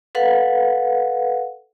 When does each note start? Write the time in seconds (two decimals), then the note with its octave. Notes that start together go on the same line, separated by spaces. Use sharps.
0.15 A4 B4 F5 F#5